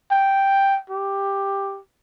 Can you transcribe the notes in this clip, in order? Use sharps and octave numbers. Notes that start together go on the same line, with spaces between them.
G5
G4